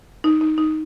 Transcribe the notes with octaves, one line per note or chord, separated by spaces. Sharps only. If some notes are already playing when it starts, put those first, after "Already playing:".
D#4
D#4
D#4